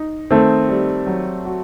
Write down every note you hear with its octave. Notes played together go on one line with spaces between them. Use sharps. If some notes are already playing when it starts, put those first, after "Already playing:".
Already playing: D#4
D#3 A3 C4
G3
F#3
F#4